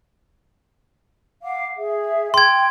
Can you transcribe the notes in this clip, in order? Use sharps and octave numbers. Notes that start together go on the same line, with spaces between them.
F5 F#5 D6
G#4 E5
G5 C6 G#6